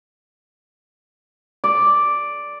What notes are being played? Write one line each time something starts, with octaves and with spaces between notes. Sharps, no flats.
D5